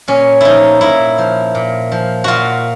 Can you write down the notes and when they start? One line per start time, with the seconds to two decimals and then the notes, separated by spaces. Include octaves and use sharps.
0.08 A#2 C#4
0.41 F3 D#4 E4
0.81 A#2 E4
1.18 F3
1.55 A#2
1.92 F3
2.24 A#2 F4 F#4